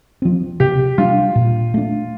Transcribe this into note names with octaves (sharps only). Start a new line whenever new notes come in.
F3 C4
C3 G4
G3 D4 F4
A#2
A3 D4